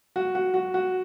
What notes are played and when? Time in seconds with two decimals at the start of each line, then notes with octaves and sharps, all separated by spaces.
0.16 F#4
0.35 F#4
0.54 F#4
0.74 F#4